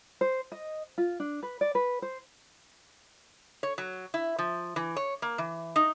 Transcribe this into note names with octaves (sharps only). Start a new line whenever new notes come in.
C5
D#5
F4
D4
B4
D5
B4
C5
C#5
F#3
E4
F3
E3
C#5
A#3
E3
D#4